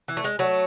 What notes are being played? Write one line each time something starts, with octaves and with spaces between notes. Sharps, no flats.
E3
A3
G#3
F#3 A3